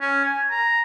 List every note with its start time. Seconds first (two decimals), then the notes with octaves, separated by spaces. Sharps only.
0.01 C#4
0.25 G#5
0.50 A#5